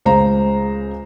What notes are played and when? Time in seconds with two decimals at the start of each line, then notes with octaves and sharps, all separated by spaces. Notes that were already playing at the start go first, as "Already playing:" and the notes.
0.05 C#2 C#3 C5 A#5